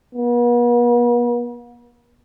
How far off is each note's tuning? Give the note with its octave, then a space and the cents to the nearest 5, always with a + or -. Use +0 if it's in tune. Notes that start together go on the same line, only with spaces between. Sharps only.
B3 -45